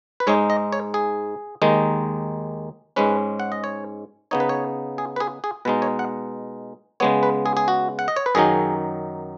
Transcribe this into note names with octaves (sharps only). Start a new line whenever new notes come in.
B4
G#2 G#3 D#4 C#5
D#5
C#5
G#4
D#2 D#3 G#3 D#4
G#2 G#3 C#4 B4
F#5
D#5
C#5
C#3 B3 D#4 C#5
B4
C#5
G#4
B4
G#4
G#4
B2 G#3 D#4 B4
C#5
F#5
C#3 G#3 B3 C#5
B4
G#4
G#4
F#4
F#5
D#5
C#5
B4
F#2 D#3 F#3 D#4 G#4